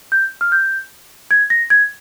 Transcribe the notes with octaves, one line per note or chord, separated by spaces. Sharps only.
G6
F6
G6
G#6
A#6
G#6